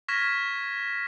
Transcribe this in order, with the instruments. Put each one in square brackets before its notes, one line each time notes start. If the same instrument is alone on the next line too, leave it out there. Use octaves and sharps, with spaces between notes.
[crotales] C#6 F6 G#6 A#6 B6 E7